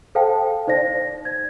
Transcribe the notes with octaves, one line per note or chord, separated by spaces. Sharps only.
A4 C5 F5 G5 A5
D#4 C5 D5 A#6
G#6